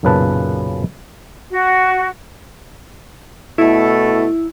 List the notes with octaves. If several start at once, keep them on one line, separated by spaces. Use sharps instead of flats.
B1 F#2 A#2 C#3 B4 A5
F#4
B2 A3 E4